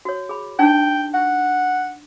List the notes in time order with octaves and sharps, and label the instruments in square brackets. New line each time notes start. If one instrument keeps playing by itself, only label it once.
[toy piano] F#4 C#5
G#4 B5
[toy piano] D4 D#4 [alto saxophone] G5
[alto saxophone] F#5